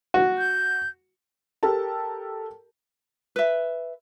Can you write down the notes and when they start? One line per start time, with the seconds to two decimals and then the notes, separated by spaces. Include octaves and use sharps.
0.14 F#4
0.38 G6
1.63 G4 A4 A#4 A5
3.36 B4 E5